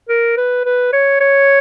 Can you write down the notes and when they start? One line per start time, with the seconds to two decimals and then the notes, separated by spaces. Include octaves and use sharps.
0.09 A#4
0.37 B4
0.65 B4
0.93 C#5
1.20 C#5